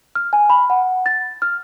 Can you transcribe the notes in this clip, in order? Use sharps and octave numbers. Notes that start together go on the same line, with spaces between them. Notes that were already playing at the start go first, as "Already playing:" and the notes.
F6
G#5
B5
F#5
A6
F6